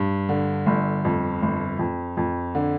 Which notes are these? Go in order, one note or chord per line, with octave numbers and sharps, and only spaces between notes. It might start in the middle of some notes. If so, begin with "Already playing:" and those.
Already playing: G2
D3
G1
F2
G1
F2
F2
D3